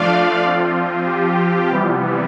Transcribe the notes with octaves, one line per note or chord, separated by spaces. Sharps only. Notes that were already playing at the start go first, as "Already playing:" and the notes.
Already playing: F3 A3 D4 F4 D5 F5
F3 C4 F4
G4
C3 E3 G3 B3